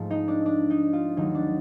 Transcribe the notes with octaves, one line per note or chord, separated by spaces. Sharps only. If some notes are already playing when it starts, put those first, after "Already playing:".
Already playing: G#2 F3 A3
D#4
D4
D4
D#4
F4
D#2 D#3 F#3 A3 D#4
D4